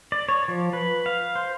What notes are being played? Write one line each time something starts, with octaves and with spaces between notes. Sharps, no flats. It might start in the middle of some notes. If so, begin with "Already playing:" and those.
D5
C#5
F3
B4
F5
C5